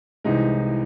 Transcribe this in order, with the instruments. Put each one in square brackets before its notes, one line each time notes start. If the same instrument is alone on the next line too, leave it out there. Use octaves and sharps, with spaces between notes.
[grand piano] C2 C3 E3 G#3 D#4